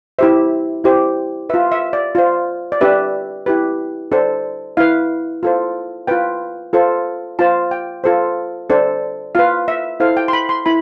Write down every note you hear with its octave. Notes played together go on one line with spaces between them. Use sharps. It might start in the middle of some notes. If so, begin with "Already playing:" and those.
E4 G4 C5 E5
E4 G4 C5
F4 B4 E5
E5
D5
F4 C5
D5
D4 G4 B4 E5
E4 G4 B4
D4 A4 C5
E4 B4 F5
F4 A4 C5
F4 B4 G5
F4 A4 C5
F4 C5 A5
G5
F4 A4 C5
D4 A4 C5
F4 B4 F5
E5
E4 A4 C5 F5
G5
C6
B5
C6
E4 B5